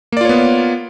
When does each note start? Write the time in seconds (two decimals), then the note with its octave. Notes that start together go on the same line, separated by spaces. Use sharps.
0.12 A#3
0.17 D5
0.21 F4
0.25 C#5
0.29 B3